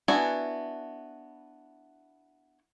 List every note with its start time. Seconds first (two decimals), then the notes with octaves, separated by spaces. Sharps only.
0.08 B3 D4 E4 F#4 G#5